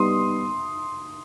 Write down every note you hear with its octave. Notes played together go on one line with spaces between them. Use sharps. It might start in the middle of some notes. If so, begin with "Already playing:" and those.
Already playing: G3 B3 D#4 C6 D#6